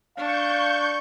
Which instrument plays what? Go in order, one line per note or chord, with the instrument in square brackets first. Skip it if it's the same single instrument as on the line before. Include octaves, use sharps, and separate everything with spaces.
[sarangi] D4 [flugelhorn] F5 [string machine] C#6 G6